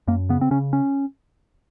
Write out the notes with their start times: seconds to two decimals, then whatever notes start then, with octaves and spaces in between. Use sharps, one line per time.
0.08 F#2 A#3
0.29 C#3 B3
0.41 C4
0.51 C#3 C#4
0.73 C#4